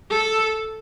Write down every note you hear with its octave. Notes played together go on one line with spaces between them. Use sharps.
A4